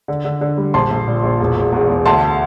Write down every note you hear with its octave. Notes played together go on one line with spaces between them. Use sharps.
D3
D3
D3
G3
A#1 A5 C6
A#1
A#2
A#1
E1
E1
E2
E1
D2 A5 C6